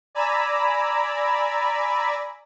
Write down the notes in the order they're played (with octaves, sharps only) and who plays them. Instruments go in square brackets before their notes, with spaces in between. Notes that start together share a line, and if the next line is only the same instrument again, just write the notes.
[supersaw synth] D5 G#5 A#5 B5 E6